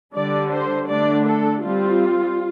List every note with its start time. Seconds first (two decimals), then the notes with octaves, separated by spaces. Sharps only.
0.14 D3 G3 D4 D5
0.52 C5
0.89 D3 A3 D4 D5
1.27 A4
1.63 G3 C4 F4